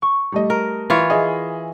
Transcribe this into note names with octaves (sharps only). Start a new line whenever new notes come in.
C#6
G3 A3 D#5
A#4
E3 F4 C#5
G#4 D#5 E5